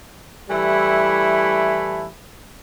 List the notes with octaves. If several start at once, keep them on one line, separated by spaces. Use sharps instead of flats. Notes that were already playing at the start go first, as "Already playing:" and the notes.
E3 G3 A3 E4